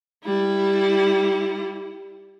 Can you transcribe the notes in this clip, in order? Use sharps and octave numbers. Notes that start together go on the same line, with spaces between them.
G3 E4